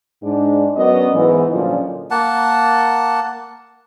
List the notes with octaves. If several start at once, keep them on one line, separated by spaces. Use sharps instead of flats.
G#2 D4
F#3 B3 C#4 A#4 D5 D#5
G#2 E3 B3
A#2 D3 F3 F#3 C#4 D#5
A#3 F#5 A5